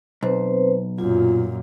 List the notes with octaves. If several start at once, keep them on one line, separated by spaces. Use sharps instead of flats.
B1 C4 B4 C5
F#2 A#2 F4